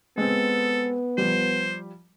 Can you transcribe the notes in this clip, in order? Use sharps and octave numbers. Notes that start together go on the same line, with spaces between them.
G#3 B3 C4 A4
F3 G3 C5